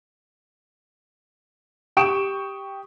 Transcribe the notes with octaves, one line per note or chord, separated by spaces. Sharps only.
G4 G5 C#6 D#6 D7 E7